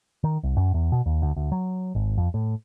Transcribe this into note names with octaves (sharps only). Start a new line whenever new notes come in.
D#3
C2
F#2
E2
B2
D#2
D2
D2
F#3
G#1
F2
A2